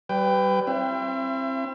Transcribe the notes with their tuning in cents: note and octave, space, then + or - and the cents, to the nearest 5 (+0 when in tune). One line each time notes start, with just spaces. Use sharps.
G3 -25 B4 +25 G5 +10
C4 +20 E4 +25 E5 +45